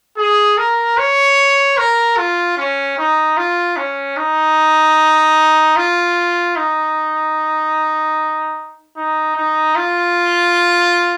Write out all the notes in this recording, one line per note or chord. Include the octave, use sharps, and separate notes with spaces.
G#4
A#4
C#5
A#4
F4
C#4
D#4
F4
C#4
D#4
F4
D#4
D#4
D#4
F4